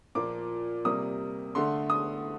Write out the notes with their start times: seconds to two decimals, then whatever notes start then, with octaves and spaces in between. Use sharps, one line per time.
0.15 A#2 F3 A#3 D6
0.85 C3 G3 A#3 D#6
1.55 D3 A3 C6
1.90 D#6